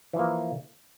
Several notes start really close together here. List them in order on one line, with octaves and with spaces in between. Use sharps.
E3 F3 A#3